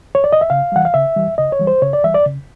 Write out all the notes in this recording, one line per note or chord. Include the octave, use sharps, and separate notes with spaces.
C#5
D5
D#5
E5
C#3 F5
E3 G3 F#5
F5
C#3 E5
E3 G3
C#3 D#5
C#5
E3 G3
C5
C#3 C#5
D5
E3 G3 E5
D5
C#3